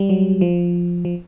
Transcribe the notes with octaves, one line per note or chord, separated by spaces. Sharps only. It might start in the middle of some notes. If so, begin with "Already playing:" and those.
Already playing: G3
F#3
F3
F3